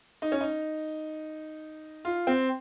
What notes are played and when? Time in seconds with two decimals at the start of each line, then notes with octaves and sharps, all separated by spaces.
0.22 D#4
0.32 C#4
0.41 D#4
2.05 F4
2.27 C4